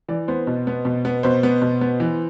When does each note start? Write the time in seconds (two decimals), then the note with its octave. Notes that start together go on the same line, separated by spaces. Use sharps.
0.09 E3 D5
0.28 B3 C5
0.47 B2
0.67 B3
0.85 B2
1.05 B3
1.23 B2 C5
1.43 B3
1.62 B2
1.81 B3
2.00 E3